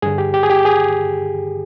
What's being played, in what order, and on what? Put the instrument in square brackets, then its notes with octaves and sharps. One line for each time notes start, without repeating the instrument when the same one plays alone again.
[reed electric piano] G2 D3 G#4
G4
G4
G#4
G4
G#4